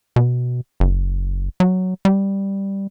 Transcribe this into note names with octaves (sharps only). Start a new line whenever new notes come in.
B2
F#1
F#3
G3